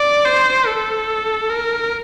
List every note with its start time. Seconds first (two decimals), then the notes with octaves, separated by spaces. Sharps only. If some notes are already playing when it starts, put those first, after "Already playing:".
Already playing: D5
0.25 C5
0.67 A4
1.50 A#4